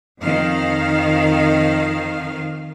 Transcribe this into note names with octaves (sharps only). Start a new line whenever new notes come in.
F2 D#3 F5